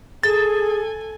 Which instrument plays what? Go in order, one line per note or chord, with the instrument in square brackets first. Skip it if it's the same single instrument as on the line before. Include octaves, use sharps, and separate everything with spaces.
[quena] G#4 [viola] A4 G#5 [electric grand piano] A6